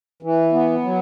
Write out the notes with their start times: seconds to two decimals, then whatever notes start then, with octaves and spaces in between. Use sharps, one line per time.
0.23 E3
0.53 B3
0.83 F#3